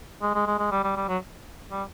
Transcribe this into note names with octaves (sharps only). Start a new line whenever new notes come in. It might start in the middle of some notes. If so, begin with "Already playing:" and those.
G#3
G#3
G#3
G#3
G3
G3
G3
F#3
G3